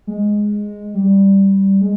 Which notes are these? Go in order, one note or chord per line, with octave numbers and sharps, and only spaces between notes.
G#3
G3
G#3